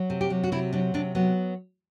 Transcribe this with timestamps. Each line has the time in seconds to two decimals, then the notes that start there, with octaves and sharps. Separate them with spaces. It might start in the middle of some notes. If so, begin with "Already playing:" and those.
Already playing: F#3
0.10 C3
0.21 G4
0.30 F#3
0.44 F#4
0.52 C3 E4
0.73 F#3 D4
0.94 C3 D4
1.15 F#3 B3